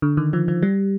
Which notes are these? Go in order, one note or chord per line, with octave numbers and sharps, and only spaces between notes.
D3
D#3
F3
F3
G3